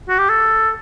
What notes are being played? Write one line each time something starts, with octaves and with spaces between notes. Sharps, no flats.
F#4
G4
A4